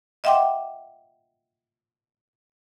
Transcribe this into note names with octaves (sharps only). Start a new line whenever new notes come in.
D#5 E5 F#5 G5 C6 D6